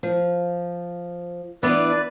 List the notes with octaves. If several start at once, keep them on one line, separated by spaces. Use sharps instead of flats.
F3
E3 B3 D4 B4 D5